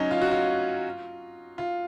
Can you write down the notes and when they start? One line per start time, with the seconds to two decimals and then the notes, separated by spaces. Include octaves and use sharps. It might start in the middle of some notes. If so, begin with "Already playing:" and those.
Already playing: F#3 C#4 D#4
0.11 F4
0.22 F#4
0.31 F4
1.58 F4